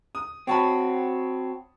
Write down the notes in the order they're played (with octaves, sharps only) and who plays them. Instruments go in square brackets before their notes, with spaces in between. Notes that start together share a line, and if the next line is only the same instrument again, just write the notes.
[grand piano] D#6
[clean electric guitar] C4 F#4 [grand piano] C#5 A5 B5